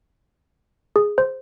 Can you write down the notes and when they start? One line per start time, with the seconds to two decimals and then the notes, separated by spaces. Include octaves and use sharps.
0.96 G#4
1.18 C5